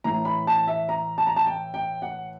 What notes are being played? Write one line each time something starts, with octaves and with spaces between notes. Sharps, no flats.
A2 E3 A#5
B5
A5
E5
A#5
A5
A#5
A5
G5
G5
F#5